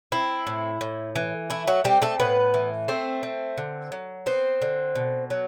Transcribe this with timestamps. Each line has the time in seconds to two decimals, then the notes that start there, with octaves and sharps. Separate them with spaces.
0.12 C4 E4
0.47 A2
0.81 A2
1.16 E3
1.50 A3 E4
1.67 F#3 F#4
1.84 G3 C4 G4
2.02 A3 A4
2.20 A2 B3 B4
2.54 E3
2.88 A3 C4 C5
3.23 C4
3.58 D3
3.92 F#3
4.26 B3 C4 C5
4.62 D3
4.95 B2
5.30 F#3